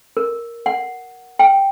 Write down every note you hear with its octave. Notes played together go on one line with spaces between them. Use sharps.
A#4
F#5
G5